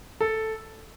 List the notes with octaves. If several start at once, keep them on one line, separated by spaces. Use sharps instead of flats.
A4